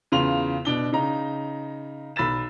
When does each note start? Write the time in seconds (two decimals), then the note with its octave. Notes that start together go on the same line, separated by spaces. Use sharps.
0.12 E2 C#3 F4 C6 F7
0.65 B2 D4 G7
0.93 C#3 D#4 A#5
2.16 B1 B5 E6 A6 E7